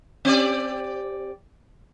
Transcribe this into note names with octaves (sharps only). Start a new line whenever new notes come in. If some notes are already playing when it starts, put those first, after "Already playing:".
C4 G4 D5